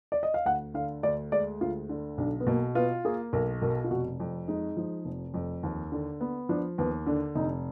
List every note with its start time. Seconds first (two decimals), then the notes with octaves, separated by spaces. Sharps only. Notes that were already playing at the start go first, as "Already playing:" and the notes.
0.12 D5
0.23 D#5
0.34 F5
0.45 D2 F#5
0.74 D3 F5
1.03 D2 D5
1.32 G#3 D5
1.61 D2 F4
1.89 D3
2.18 B1 D4
2.40 B3
2.47 B2 A#3
2.75 B3 F4
3.05 A#3 G#4
3.33 B1 A#4
3.62 B2 A#4
3.84 F4
3.91 F1 F#4
4.20 F2
4.48 G#3 D#4
4.77 F3
5.05 F1
5.34 F2
5.63 D#2
5.92 D3
6.20 B3
6.49 F3 D4
6.78 D#2 B3
7.06 D3 D4
7.35 F1 D#4